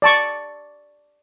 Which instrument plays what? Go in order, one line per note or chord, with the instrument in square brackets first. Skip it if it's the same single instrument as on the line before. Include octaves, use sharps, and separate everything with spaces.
[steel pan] D5 A5 C#6